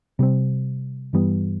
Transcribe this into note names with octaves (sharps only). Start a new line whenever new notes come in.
C3 G3 C4
G2 E3 G3 B3